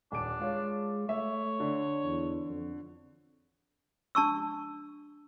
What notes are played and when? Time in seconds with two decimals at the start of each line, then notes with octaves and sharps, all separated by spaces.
0.12 D#1 D4 D7
0.40 G#3 F4 C#5
1.09 A3 C#5 E5
1.60 D3
2.04 E2
2.49 F2
4.15 D4 A5 C#6 E6